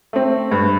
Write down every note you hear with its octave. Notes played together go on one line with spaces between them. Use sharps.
A3 C4
G2